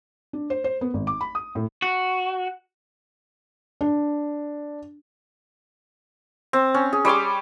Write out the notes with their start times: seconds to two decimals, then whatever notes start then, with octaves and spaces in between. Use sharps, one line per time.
0.33 D4
0.50 C5
0.64 C5
0.81 B3
0.94 G#1
1.07 D6
1.21 B5
1.35 D#6
1.55 A2
1.82 F#4
3.81 D4
6.53 C4
6.75 C#4
6.93 G#4
7.05 G3 C#5 C6 D6